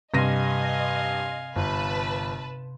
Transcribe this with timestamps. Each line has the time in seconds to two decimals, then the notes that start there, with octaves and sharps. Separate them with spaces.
0.14 G2 C3 D#5 F5 G#5 C6 A#6 D#7
1.56 G1 B4 A5